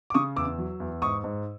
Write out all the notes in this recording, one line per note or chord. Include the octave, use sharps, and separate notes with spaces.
D6
C#3 C#6 D#6
E2 D6 E6
F#3
E2
G#2 C#6 D#6
G#2